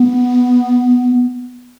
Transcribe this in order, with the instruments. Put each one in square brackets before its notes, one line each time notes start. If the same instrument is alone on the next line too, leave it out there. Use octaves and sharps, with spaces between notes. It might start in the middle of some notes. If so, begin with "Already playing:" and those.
Already playing: [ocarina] B3